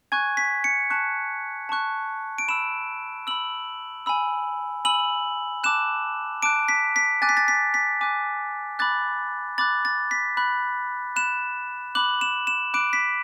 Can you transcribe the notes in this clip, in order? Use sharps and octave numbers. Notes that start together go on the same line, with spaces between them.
G#5 C#6 F#6 G#6
B6
C#7
A5 C#6 F#6
A5 C#6 F#6
D7
B5 E6 E7
B5 E6 F#7
G#5 B5 E6
G#5 B5 E6 F#7
A5 D6 F#6 E7
A5 D6 F#6 D7
B6
B6
G#5 D6 F#6 A6
B6
A6
B6
B6
G#5 D6 F#6
B5 D6 F#6 A6
B5 D6 F#6 A6
A6
B6
B5 F#6
B5 F#6 E7
B5 D6 F#6 F#7
E7
E7
B5 D6 F#6 D7
B6